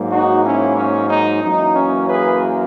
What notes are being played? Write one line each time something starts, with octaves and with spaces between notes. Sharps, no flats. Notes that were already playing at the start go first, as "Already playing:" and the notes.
Already playing: G#2 F#3 A#3
D#4 F#4
C#4 E4
C#4
D#4
F#2 E3 A#3 D#4
C#4
G#4 B4